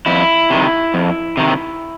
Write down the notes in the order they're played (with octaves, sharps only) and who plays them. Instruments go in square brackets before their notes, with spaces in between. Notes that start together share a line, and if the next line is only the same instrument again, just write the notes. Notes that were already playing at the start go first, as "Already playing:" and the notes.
[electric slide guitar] F2 E4
C3 D#3
F2
C3 D#3